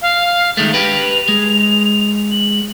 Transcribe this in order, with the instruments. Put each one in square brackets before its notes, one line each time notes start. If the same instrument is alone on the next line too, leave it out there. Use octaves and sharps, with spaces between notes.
[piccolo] F5
[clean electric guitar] D#3 G#3 A3 [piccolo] F7
[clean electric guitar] G4 B4
G#3
[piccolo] F#7